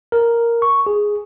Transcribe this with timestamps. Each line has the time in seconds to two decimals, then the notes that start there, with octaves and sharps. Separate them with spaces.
0.12 A#4
0.62 C#6
0.86 G#4